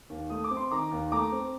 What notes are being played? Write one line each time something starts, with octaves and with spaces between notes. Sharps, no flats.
D#2
A3 D#6
D6
C4
C6
D#3 A#5 D6
D#2
A3 A#5 D6
C4